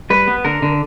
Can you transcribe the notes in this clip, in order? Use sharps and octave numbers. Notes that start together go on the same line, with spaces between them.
G3 B4
B3
D3 A#4
D3